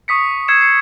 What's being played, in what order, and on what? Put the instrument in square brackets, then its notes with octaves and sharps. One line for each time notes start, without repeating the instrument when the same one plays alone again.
[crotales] C#6 D#6 B6 C#7
D#6 E6 G#6 C7 C#7 E7
C7 C#7